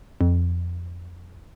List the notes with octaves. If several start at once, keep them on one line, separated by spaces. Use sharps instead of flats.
F2